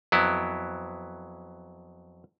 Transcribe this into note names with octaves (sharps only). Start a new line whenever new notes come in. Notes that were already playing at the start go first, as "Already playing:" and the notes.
F2 F#3 B3 E4